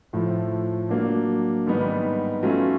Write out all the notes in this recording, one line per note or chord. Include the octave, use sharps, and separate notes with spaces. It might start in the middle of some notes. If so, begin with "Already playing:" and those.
A2 F3 A3
F#3 A#3 D4
G#2 D#3 G3 B3 D#4
F#3 A3 C#4 F4